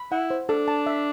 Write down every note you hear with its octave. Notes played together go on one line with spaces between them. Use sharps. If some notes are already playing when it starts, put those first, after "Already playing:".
Already playing: B5
E4 F#5
C5
D4 A4
A5
E5